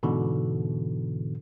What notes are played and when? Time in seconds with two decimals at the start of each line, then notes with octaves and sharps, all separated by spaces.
0.03 G#2 B2 D3 E3